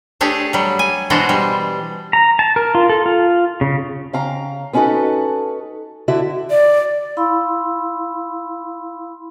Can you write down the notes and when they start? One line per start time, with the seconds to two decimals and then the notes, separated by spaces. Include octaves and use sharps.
0.21 A3 D4 G4 G#4 C#5
0.53 F#3 G3
0.79 G#5
1.10 B2 E3 G#3 D4 F#4 C5
1.29 G3
2.13 A#5
2.39 A5
2.56 A#4
2.75 F4
2.89 A4
3.06 F4
3.61 C#3
4.13 C#3 F5 G5 A#5
4.73 B3 C#4 D#4 F#4 A4 B4
6.08 D3 E4 F#4 E5
6.51 D5
7.17 E4 F5 B5 C6 E6